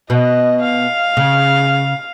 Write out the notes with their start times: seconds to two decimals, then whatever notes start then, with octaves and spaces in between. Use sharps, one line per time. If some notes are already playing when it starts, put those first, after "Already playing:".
0.10 B2 D#5
0.63 F5
1.17 C#3